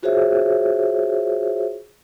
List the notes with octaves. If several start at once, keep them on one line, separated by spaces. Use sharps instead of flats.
F4 F#4 G#4 C5 C#5 E5